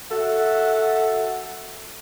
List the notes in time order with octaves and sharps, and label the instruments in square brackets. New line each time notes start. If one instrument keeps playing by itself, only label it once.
[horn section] F#4 A4 E5 F#5